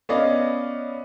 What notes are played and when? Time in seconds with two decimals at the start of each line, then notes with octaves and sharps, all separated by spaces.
0.09 B3 C#4 D5 D#5 F5